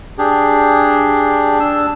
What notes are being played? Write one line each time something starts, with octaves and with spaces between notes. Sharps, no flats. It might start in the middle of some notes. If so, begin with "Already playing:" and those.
D4 G4 G#4
D4 E6